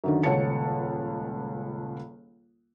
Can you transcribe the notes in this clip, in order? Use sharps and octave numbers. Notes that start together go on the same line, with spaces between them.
F#2 D3 D#3
D#1 C#2 C#5 F#5 A5 C#7